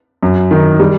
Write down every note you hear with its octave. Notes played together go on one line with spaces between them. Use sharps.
F#2
D#3
G3